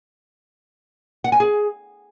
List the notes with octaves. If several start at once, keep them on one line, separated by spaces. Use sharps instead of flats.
F#5
G#5
G#4